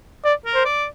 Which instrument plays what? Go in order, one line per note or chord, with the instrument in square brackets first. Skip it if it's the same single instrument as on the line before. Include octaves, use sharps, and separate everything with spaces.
[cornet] D5
[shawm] A#4
[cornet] C5
[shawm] D5